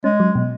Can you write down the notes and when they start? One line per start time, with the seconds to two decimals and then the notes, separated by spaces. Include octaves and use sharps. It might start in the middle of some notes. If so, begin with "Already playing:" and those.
0.04 G#3 C#4
0.20 F#3
0.35 B2